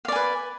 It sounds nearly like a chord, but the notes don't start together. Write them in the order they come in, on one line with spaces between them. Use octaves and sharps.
F5 D5 G#5 B4